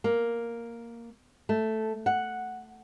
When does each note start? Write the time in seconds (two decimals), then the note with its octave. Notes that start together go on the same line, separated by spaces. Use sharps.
0.04 A#3
1.49 A3
2.06 F#5